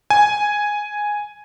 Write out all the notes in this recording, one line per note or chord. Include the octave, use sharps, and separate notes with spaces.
G#5